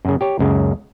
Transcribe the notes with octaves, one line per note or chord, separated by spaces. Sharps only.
F#2 C#3
G4 C#5
C#2 F#2 C#3